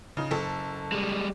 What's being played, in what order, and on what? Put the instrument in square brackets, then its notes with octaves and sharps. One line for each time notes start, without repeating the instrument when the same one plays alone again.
[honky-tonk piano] C#3 D#4
F#1 A4
[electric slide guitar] G3 G#3